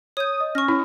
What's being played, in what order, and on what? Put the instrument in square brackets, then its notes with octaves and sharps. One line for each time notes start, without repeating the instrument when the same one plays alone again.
[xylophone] C#5 G6 [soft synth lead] D#6
[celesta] D#5
[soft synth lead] C#4 [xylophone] C#6 A#6 [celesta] F6
[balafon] E4